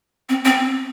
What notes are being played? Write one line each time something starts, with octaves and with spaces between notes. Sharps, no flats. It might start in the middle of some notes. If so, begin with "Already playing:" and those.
C4
C4